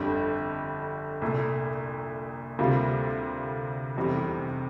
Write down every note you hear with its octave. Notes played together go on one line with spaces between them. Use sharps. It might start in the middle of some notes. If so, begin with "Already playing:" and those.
Already playing: G1 F2 D3 G3
C2 A#2 A3
D2 C3 G3 A#3 F4
F1 E2 C3 E3 G3